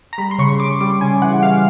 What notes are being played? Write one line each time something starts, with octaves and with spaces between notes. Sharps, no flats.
A#5
G3 B5
C6
C#3 C#6
C#3 D6
G3 D6
C#3 G#5
E3 F#5
E3 F5